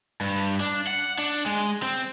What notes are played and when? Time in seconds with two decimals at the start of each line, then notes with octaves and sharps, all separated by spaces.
0.21 G2
0.60 D4
0.87 F#5
1.18 D4
1.46 G#3
1.83 C4